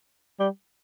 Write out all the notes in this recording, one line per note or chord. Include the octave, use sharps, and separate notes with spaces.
G3